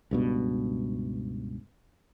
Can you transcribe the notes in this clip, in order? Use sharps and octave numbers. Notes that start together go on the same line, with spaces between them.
C#2 G2 B2